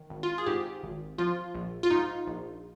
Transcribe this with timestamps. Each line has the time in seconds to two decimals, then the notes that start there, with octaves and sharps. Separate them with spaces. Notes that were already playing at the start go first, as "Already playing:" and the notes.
Already playing: D#3
0.10 G#1
0.23 F4
0.38 G#4
0.46 G#2 G4
0.83 G#1
1.18 F3 F4
1.55 A#1
1.83 F4
1.91 G#2 D#4
2.27 A#1